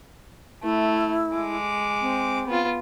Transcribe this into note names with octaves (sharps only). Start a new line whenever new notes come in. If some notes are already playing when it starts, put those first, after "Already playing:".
A3 E4
G#3 D6
C4
B3 F4